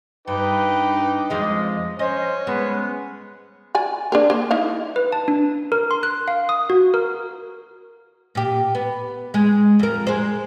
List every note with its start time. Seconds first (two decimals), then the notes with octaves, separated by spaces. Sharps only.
0.27 G2 D#4 B4 G5 D6
1.30 F2 F3 G#3 D#5
1.99 C#4 C5 D#5
2.47 G#3 B3
3.75 D5 G#5 B5
4.12 D4 G#4 A#4
4.30 A#3 C5
4.51 D#4 E4 F5
4.96 B4
5.12 A5
5.28 D4
5.72 A#4
5.91 C6
6.03 F#6
6.28 F5
6.49 D#6
6.70 F#4
6.94 A#4
8.35 A#2 G4
8.75 B3
9.34 G#3
9.79 F2 A#4
10.07 G#3 C5